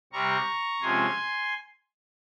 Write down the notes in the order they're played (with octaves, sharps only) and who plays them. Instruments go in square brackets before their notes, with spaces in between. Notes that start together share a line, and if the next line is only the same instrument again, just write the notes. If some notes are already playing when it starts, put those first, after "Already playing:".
[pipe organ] C3 G3 C4 A#5 C#6
C3 F3 G#3 C#4 G#5 C6